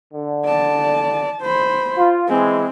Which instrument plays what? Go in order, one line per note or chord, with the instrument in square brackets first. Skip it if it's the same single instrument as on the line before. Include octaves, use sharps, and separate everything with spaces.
[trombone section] D3
[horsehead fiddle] D5 A5
C5 B5
[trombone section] F4
[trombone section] E3 G#3 [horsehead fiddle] C4